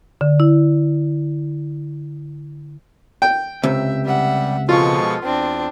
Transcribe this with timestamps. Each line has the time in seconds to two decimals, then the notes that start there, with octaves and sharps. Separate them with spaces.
0.21 D3
0.40 E4
3.22 G5
3.63 C#2 C3 E5
4.06 G3 E5 F#5
4.69 B2 F3 G#3 F4 A4 C#6
5.24 E2 C4 D4